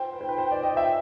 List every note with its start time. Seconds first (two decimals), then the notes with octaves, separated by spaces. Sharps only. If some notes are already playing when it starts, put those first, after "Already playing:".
Already playing: C5 G5
0.13 B4
0.21 C5
0.29 B4
0.38 C5
0.51 D5
0.63 D#5
0.77 E5